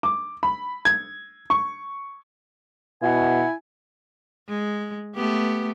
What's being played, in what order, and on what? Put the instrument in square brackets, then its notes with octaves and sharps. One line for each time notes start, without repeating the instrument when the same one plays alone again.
[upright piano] D6
B5
G#6
C#6
[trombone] B2 [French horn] E4 [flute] F#5 [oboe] G#5
[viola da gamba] G#3
A3 B3 G4